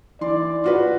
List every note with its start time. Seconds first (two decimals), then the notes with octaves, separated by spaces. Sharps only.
0.21 E3 D5 C6
0.64 F4 F#4 B4